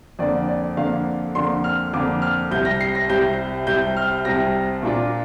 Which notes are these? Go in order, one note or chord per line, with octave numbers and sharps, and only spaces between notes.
F2 D3 A#3 D4 D5
D5
F2 D3 A#3 D4 F5
F2 D3 A#3 D4 C6
F6
F2 D3 A#3 D4 D6
F6
C2 C3 G3 G6
A#6
C7
A#6
C2 C3 G3 G6
C2 C3 G3 G6
F6
C2 C3 G3 A#6
A#2 A#3 D4 F4